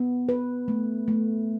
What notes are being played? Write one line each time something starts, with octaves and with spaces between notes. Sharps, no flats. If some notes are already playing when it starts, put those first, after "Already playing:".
Already playing: B3
B4
A3
A3